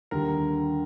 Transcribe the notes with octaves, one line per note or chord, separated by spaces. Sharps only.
D#2 D3 G3 A#4